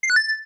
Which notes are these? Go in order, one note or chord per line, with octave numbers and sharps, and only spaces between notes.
C7
F#6
A6